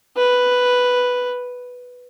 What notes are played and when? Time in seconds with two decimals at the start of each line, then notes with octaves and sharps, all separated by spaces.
0.17 B4